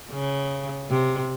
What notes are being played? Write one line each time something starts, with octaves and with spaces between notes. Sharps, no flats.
C#3
C3